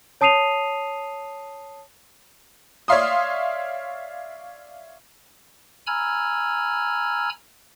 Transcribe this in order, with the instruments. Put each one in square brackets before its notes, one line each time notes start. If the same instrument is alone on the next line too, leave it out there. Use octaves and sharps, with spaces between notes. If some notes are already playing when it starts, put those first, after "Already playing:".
[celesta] C#5 A5 D#6 C7 D#7 F7
[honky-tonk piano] C#5 D5 E5 F5 C6 D#6
[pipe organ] G#5 A#5 B5 E6 F6 G#6